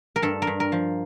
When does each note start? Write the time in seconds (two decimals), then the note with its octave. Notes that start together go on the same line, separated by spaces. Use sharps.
0.16 A#4
0.22 G2 A4
0.42 A#4
0.47 G2
0.60 A#4
0.72 F3